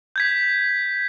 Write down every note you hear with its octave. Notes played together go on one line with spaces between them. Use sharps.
G6 G#6 B6